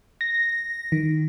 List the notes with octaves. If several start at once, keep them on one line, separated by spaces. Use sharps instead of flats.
A#6
D#3